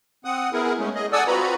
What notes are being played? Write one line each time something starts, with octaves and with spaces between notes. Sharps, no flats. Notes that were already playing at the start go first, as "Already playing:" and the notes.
C4 F#5 D#6
B3 E4 G#4 A#4
G#3 A3 C#4
G#4 D#5
A4 D5 F#5 G#5 D#6 E6
C4 F4 F#4 B4 A#5 B5